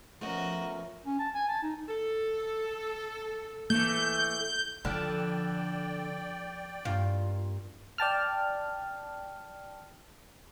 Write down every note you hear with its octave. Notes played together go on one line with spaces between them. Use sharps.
F3 A3 B3 C#4 F#4 A#4 D#5
C#4
A5
G#5
A5
D#4
A4
E3 A3 A#3 G6
D3 F3 D5 G5 A5 B5 F6
G2 A#3 F4
D5 G5 A5 F6